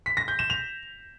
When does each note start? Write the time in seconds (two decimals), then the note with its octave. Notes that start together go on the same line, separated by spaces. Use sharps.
0.06 B6
0.17 A#6
0.28 G6
0.39 E7
0.50 F7